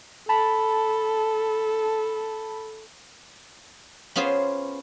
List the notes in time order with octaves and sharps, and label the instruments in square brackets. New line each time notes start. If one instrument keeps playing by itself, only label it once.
[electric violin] A4 [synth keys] A5 B5
[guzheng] B3 C#4 F4 G#4 C5